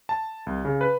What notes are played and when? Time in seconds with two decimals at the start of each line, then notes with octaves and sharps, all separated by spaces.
0.09 A5
0.47 C2
0.65 C#3
0.81 B4